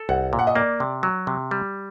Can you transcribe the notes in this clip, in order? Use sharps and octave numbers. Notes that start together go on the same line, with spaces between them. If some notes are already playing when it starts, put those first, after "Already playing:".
Already playing: A4
C2 F#5
A#2
F#5
D#5
A#3 D5
C3
F#3
C3
G3